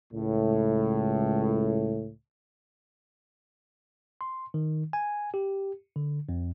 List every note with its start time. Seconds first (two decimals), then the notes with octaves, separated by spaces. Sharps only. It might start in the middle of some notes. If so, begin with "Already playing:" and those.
0.13 C#2 A2
4.21 C6
4.54 D#3
4.93 G#5
5.34 G4
5.96 D3
6.29 F2